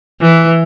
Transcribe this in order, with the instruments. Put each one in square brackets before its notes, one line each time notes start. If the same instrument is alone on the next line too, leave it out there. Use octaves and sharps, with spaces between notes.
[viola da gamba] E3